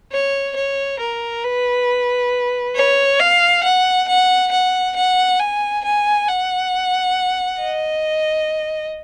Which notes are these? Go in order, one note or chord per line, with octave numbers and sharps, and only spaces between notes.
C#5
C#5
A#4
B4
C#5
F5
F#5
F#5
F#5
F#5
G#5
G#5
F#5
D#5